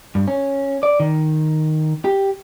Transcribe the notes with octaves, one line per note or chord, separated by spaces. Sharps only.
G2
C#4
D5
D#3
G4